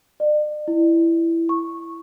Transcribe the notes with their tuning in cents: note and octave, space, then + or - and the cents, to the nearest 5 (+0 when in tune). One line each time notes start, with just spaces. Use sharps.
D5 +40
E4 +10
C#6 -10